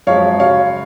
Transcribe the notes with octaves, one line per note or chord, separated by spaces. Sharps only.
F#2 F3 G#3 C#5 F5
F#2 C#3 F#3 C#5 F5